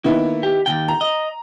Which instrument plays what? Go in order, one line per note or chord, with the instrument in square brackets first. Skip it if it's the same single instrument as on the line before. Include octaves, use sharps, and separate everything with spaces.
[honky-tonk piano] D#3 B3 E4 [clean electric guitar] A#3
[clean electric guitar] G4
D#2 C#3 G5
[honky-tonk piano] A#5
[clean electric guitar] D#5